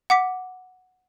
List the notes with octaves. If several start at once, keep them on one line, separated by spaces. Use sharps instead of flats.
F#5 D6 B6